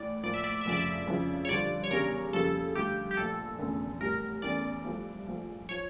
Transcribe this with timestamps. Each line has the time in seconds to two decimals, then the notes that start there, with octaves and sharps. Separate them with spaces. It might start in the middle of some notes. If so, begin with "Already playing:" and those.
Already playing: A2 E3 D5
0.23 A2 F3 A#3 D5
0.34 E5
0.44 D5
0.61 E5
0.65 F1 F2 C#3 D5
0.77 E5
1.07 F2 C#3 F3 C#4 E4
1.45 C#5
1.49 G2 D3 F3 D5
1.84 C#5
1.91 E2 C#3 G3 D4 A#4
2.33 F2 C#3 G3 A#3 C#4 A4
2.75 G2 D3 A3 G4
3.11 G4
3.16 A#1 A#2 A3 A4
3.59 F1 E2 D3 A3 C#4
4.00 A1 A2 G3 A#4
4.42 E2 E3 A3 C#4 D5
4.84 G2 F3 A3 E4
5.26 A#1 A#2 F3 A3
5.69 F3 C#5